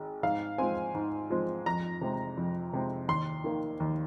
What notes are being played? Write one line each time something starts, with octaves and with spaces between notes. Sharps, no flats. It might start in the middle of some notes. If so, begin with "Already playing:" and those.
Already playing: G#1
G#2 F5
F3 G#3 C4 G#5
G#2
F3 G#3 C4
F2 A#5
C3 G#3 C4
F2
C3 G#3 C4
D#2 C6
D#3 A#3
D#2